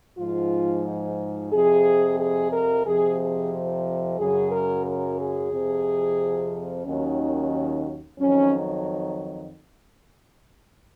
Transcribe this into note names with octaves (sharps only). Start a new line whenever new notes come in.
G#2 F3 F4
F2 C3 F3 G#4
G#4
A#4
F2 C3 F3 G#4
G#4
F#2 C#3 F#3 G#4
A#4
A#4
G#4
F2 C3 F3
D#2 D#3 F#3 C#4
F2 D#3 F#3 C#4